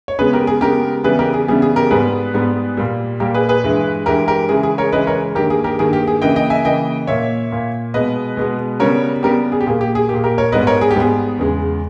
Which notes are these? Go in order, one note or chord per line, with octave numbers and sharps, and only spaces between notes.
C#5
C#3 G#3 B3 G#4 B4
G4 A#4
G#4
C#3 G#3 B3 G4 A#4
C#3 E3 G3 B3 G#4 B4
G4 A#4
G#4
C#3 E3 G3 B3 G#4
G#4
G4 A#4
G#2 G3 B3 G#4 B4
G#2 G3 B3
A#2 G3 A#3
A#2 G3 A#3 G4 A#4
G#4 B4
G#4 B4
G2 E3 G#3
G2 E3 G#3 G4 A#4
G4 A#4
C#3 E3 G#3 G#4
G#4
A#4 C#5
C#3 E3 G#3 B4 D#5
A#4 C#5
G2 D#3 A#3 G4 A#4
G#4
G4 A#4
G2 D#3 A#3 G#4
G4
G#4
C#3 E3 A#3 D#5 G5
D#5 G5
E5 G#5
C#3 E3 A#3 D#5 G5
A#2 A#3 C#5 E5
A#2 A#3
B2 G#3 B3 B4 D#5
B2 G#3 B3
C#3 G3 B3 A#4 C#5
C#3 G3 B3 G4 A#4
G#4
G4
A#2 A#3 G#4
G4
G#4
A#2 A#3 G4
G4 A#4
A#4 C#5
G#2 G3 B3 B4 D#5
A#4 C#5
G#4
G4
G#2 G3 B3 G#4
E2 C#3 G#3